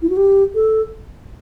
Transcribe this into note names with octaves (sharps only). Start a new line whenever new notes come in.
E4
F#4
G4
A4